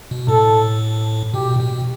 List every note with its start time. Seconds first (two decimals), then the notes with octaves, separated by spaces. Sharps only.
0.11 B2
0.28 A2 A4
1.34 B2 G4
1.60 B2